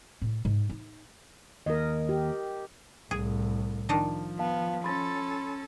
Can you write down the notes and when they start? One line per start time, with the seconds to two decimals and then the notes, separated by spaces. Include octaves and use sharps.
0.22 A2
0.45 G#2
0.70 D#4
1.66 D#2 A#4 D#5
2.09 G4
3.11 C2 A2 G#4
3.89 D#3 F3 D4 D#4
4.39 B3 F5 A5
4.84 C#4 A4 B5 C6 A6